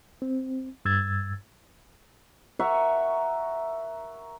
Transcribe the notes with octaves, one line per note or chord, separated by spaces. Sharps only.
C4
G2 E6 G#6 A6
A#4 E5 F#5 C#6